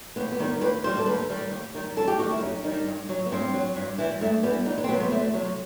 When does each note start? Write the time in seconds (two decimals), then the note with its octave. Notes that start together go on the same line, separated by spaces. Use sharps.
0.16 D#2 B3
0.32 B3
0.40 D#3 G3
0.61 D#2 B4
0.84 D#3 G3 C5
0.98 A4
1.06 D#2 B4
1.30 D#3 G3
1.52 D#2
1.74 D#3 G3
1.96 F#2 A4
2.08 G4
2.19 G3 F#4
2.22 D#3
2.30 E4
2.41 F#2 D#4
2.64 D#3 G3 D#4
2.86 G2
3.09 F#3
3.26 B3
3.32 G2 C4
3.54 F#3
3.76 G2
3.98 E3 G3
4.21 G2 A3
4.43 E3 G3 B3
4.66 E2 D#4
4.78 B3
4.84 C4
4.89 C3 F#3 B3
5.00 B3
5.11 E2 A3
5.33 C3 F#3